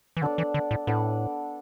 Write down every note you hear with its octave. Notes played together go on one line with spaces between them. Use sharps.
E3
D3 B3 D4 A4 D5
E3
D3
A2
A2 B3 D4 A4 D5